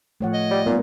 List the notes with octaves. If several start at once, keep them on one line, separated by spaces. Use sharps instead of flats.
A2 F3 A3 C#5 F#5
D#5
G3
A#2 G3 B3 D#4 A#4 B4